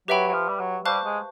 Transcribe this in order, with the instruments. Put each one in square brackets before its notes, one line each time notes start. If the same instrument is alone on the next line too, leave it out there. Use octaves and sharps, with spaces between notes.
[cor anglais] F#3 [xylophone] G4 B4 E5 G5 B5
[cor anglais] F#3
F3
G3
F#3
[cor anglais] G3 [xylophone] C5 F5 A5 C#6 F#6
[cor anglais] G#3